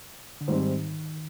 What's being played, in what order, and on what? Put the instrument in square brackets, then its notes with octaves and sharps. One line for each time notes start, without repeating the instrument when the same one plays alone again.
[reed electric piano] D3
[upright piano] G#2 G3 C4 [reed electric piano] D#3